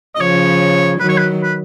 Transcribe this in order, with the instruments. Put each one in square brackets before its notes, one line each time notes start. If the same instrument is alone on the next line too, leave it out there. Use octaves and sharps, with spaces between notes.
[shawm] D#5
[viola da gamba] C#3 F3 [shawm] C#5
[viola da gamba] D#3 F#3 [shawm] B4
[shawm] C#5
B4
B4